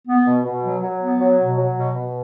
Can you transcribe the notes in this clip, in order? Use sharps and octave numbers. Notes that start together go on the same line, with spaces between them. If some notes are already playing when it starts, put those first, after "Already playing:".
B3
B2
B2
F#3
F#3
B3
F#3
B2
F#3
B2
B2